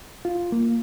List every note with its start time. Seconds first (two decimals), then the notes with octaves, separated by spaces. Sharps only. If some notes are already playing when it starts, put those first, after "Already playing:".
0.25 F4
0.52 A#3